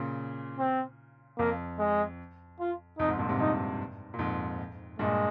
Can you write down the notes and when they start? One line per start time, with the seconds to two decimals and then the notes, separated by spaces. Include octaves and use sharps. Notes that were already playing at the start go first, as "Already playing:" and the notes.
Already playing: A#2 C#3
0.59 C4
1.38 F2 A#3
1.79 G#3
2.60 F4
2.98 F2 D#4
3.08 F2 G#2
3.18 G2 A#2
3.29 G#2 C3
3.39 G2 D#4
4.14 A#2
4.19 F2 G#2
4.99 G2 A#2 G#3